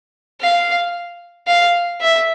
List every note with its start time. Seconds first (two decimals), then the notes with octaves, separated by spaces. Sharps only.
0.41 F5
1.47 F5
2.01 E5